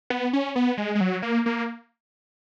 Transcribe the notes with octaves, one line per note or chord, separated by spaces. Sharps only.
B3
C#4
B3
G#3
G#3
F#3
A#3
A#3